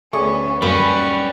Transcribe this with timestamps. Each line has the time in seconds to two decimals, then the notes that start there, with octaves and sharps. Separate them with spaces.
0.13 D2 A3 B3 C#4 G#4 D5 C#6
0.62 F#2 G3 A#3 C#4 B4 C#5 G#5 C#6